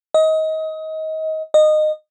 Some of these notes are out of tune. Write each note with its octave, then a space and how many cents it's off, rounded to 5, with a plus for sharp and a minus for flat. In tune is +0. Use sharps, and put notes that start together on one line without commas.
D#5 +25
D#5 -20